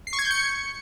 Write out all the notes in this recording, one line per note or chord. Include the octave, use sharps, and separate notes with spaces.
C7
C#6
G#6
G6
C#7